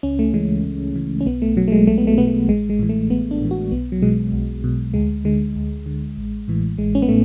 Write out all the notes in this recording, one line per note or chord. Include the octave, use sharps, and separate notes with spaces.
C#2 C#4
A3
C#3 E3 G#3
C#2
C#3 E3
C#4
B1 B3
A3
B2 F#3
A3
G#3
B1 A3
B3
A3
B2 B3
A3
A1 G#3
G#3
A2 E3
A3
A1 B3
D4
A2 E3
F#4
B1 B3
F#3
B2 G#3
B1
B2
D2 G#3
D3 G#3
D2
D3
A1
A2 E3
A1 G#3
C#4
B3
A2 A3